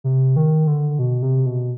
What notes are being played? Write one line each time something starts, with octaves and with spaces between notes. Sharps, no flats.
C3
D#3
D3
B2
C3
B2